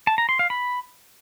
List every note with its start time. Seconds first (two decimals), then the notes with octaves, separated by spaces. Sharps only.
0.07 A5
0.18 A#5
0.29 C6
0.39 F5
0.50 B5